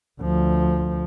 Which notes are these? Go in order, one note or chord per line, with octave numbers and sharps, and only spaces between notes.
D2 F3